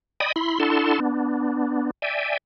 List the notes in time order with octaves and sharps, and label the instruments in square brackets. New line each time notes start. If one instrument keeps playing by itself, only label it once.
[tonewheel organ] D5 D#5 G5 G#5 B5 D#6
E4 B5 C6
D4 E4 A4 F#5 A5 C6
B3 D4
D5 E5 G5 G#5